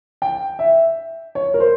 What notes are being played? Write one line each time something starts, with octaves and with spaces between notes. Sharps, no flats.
G5
E5
C#5
A#4
C5